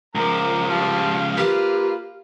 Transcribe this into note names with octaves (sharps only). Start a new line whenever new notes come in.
C#2 F3 A#4 A#5 D6
G3 F5 A5
A#3 F4 G4 B4